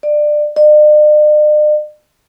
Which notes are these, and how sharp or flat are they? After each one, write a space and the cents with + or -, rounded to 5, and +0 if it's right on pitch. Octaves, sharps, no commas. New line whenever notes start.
D5 +20
D5 +45